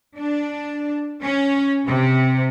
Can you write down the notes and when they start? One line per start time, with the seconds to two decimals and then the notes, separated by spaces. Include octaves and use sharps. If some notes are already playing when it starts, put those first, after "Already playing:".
0.18 D4
1.23 C#4
1.87 C3